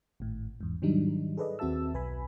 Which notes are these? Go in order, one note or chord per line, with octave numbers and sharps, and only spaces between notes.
G#1 A2
E2 G#2
G#2 D#3 F#3 G3 D4 D#4
G#4 A4 B4 D5 D#5
D#2 C4 F#4 E5 A5 E6
B1 B4 G#5 B5